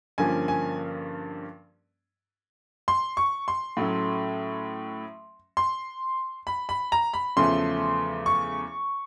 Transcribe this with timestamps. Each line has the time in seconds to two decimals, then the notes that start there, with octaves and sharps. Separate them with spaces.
0.18 G2 D3 F3 A#3 C#4 G#5
0.48 G#5
2.88 C6
3.17 C#6
3.48 C6
3.77 A2 F#3 A3 C#4
5.57 C6
6.47 B5
6.69 B5
6.92 A#5
7.14 B5
7.36 E2 C#3 F3 A3 C#4 C6
8.26 C#6